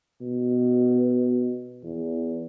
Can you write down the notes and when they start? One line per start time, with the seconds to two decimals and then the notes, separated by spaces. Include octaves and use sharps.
0.21 B2
1.84 E2